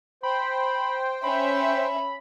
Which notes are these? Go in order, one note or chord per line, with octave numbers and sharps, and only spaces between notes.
C5 G5 B5
C#4 E5 B5